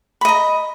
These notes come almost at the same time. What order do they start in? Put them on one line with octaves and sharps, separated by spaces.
B5 D#5 A#5